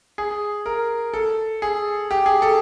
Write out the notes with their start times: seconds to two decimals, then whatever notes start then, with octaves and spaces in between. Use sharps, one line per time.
0.18 G#4
0.66 A#4
1.14 A4
1.62 G#4
2.11 G4
2.26 G#4
2.42 A4